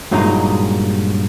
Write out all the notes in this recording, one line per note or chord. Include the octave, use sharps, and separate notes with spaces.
G2 A#2 F#3 G#3 D#4